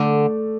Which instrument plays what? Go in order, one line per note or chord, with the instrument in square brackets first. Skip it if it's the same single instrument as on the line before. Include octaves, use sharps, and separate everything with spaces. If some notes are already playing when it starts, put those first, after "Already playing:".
Already playing: [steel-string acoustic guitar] D3 [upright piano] A3